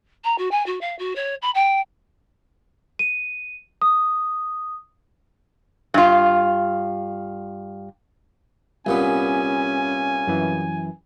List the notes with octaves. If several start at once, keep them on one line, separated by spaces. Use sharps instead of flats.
A#5
F#4
G#5
F#4
F5
F#4
C#5
B5
G5
D#7
D#6
G2 F4
C2 A#2 B3 C#4 G#5
F#2 E3